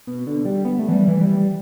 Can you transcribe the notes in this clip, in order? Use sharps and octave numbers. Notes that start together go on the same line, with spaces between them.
B2
D3
G3
B3
A3
E3
G3
E3
G3